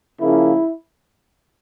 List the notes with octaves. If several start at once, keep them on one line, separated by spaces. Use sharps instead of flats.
C#3 F3 A#3 E4